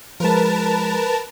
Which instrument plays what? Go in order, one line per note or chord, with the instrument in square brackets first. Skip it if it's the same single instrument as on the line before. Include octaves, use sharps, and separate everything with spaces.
[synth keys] F3 G#3 [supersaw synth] A#4 B4 A5